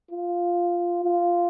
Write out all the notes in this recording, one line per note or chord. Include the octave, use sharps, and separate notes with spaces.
F4
F4